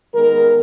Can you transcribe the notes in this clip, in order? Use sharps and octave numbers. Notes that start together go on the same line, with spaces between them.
D#3 G#3 B3 G#4 A#4